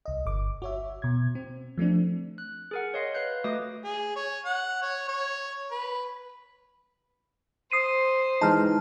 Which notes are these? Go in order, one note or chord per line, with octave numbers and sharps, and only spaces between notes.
C2 D#5
G1 D6
F#4 C#5 E5
B2 G#6
C4
F3 A3 C4 D4
F#6
G#4 A#4 F#5
C#5 D#5 F5 C6
B4 F5 F#6 G6
A3 F#4 B4 D#5 D6 D#6
G#4
C#5
F#5
C#5
C#5
B4
C5 D#6 C7 D#7
E3 G#3 D#4 A5 F6